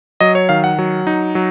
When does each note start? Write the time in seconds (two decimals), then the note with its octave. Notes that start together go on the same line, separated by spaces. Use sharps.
0.20 F#3 D#5
0.35 C#5
0.49 D#3 F5
0.64 F#5
0.79 F#3
1.07 D#4
1.35 F#3